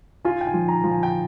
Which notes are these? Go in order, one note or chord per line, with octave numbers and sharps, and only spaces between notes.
F4 G#5
G5
G#5
F3
A#5
F3
G#5
G5